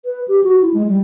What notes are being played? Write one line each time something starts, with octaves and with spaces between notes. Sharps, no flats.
B4
G4
F#4
E4
G#3
G3